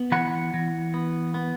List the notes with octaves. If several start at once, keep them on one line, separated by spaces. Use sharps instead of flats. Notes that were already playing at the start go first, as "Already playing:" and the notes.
Already playing: B3
E3 F#5 B5
E3
B3
B3